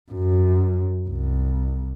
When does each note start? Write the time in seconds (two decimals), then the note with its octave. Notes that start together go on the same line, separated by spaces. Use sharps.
0.12 F#2
1.08 C2